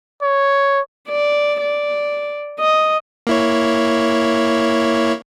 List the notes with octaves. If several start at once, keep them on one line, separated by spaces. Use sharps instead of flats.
C#5
D5
D5
D#5
A#3 E4 C#5